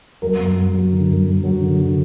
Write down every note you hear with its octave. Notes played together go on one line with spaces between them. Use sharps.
F#3 A#4
F#2
F#2
F#3
D3
F#2
F#2
F#3
D3
D3